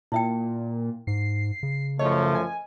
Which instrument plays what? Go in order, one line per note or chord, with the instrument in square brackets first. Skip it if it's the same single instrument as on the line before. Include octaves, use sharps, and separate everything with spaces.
[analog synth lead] A#2 [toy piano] E4 E5 G5
[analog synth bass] G#2 [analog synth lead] C7
[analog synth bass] C#3
[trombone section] F#2 F3 A3 [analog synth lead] C#5 [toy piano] D#5
[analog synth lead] G#5